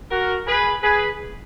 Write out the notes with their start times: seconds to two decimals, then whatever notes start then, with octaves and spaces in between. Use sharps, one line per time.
0.11 F#4 A#4
0.47 G#4 B4
0.83 G#4 B4